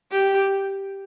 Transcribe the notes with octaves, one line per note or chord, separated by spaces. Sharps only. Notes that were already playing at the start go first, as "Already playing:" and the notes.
G4